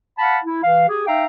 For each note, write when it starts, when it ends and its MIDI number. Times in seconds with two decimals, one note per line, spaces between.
0.19 0.37 77
0.19 0.37 78
0.19 0.37 81
0.19 0.37 83
0.44 0.63 64
0.63 0.86 52
0.63 0.86 77
0.88 1.07 67
0.88 1.07 68
1.07 1.25 63
1.07 1.25 76
1.07 1.25 77
1.07 1.25 79
1.07 1.25 82